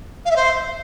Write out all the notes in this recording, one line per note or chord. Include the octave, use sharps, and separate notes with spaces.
F5
E5
C5